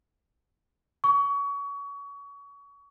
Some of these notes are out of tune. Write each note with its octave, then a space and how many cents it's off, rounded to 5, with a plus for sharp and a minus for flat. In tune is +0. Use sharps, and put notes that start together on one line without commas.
C#6 +30